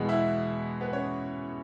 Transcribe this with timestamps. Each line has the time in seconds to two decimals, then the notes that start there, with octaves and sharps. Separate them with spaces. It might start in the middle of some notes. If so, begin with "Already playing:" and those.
Already playing: E2 B2 G#3 B3
0.09 E4 E5
0.81 B3 B4
0.93 C#4 C#5